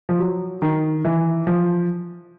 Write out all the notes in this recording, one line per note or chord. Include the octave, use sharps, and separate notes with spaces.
F3
F#3
D#3
E3
F3